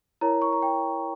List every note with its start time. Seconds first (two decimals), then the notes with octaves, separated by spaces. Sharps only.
0.21 E4 A#4 C#5 A#5
0.42 C#6
0.53 A#5
0.62 G5